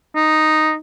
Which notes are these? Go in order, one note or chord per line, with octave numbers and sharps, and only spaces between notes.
D#4